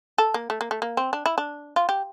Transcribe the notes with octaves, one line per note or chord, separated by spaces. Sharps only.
A4
A#3
A3
A#3
A3
A#3
C4
D4
E4
D4
F4
G4